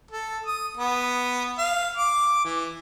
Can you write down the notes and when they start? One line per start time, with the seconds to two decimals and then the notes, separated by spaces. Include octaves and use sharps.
0.11 A4
0.46 D#6
0.77 B3
1.58 F5
1.97 D6
2.44 E3